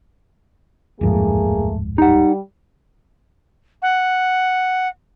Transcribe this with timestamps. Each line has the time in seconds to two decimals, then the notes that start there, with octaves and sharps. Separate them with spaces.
1.01 D1 F2 G#2 A3 A#3 G#4
1.98 G3 D#4 G4 F#5
3.82 F#5